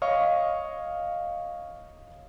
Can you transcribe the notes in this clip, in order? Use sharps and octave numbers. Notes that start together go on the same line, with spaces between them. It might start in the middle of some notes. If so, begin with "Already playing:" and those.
C#5 D#5 F5 C#6